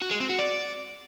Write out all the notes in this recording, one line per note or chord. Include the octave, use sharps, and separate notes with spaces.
F#4
G#3
C4
F#4
D5